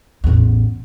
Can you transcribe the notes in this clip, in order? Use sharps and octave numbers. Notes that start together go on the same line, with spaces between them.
A1 E2